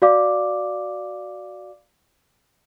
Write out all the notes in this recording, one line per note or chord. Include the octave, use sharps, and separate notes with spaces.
F#4 D5 F5 D6